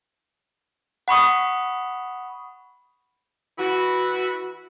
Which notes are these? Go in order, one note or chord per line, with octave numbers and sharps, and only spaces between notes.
F#5 B5 C#6 D#6
E3 E4 F#4